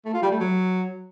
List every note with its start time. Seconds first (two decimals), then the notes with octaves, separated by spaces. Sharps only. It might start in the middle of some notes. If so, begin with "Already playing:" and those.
0.05 A3
0.14 F4
0.22 G3
0.31 A3
0.40 F#3